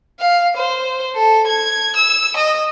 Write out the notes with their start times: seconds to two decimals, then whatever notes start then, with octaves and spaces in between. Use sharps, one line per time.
0.20 F5
0.56 C5
1.15 A4
1.47 G#6
1.96 E6
2.37 D#5